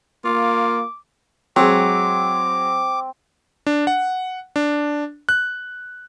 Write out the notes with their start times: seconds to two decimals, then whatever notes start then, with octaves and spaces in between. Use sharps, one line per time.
0.25 A#3 F4 D6
1.56 F#3 G#3 C4 D6
3.67 D4
3.87 F#5
4.56 D4
5.29 F#6